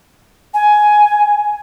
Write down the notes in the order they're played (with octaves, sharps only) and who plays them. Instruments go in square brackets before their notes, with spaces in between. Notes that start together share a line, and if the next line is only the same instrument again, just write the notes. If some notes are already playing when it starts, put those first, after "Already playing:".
[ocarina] G#5